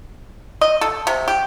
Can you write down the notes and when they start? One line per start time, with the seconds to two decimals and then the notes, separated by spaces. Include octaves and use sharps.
0.61 D#5
0.81 A4
1.07 C3
1.28 G4